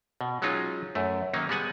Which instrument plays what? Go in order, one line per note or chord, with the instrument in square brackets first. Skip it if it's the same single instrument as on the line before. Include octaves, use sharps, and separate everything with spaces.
[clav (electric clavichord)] B2
F#3 G#3 C#4 D#4 F4
F#2 A3
D#3 F#3 A#3 C#4 D#4
G3 G#3 B3 F#5 G#5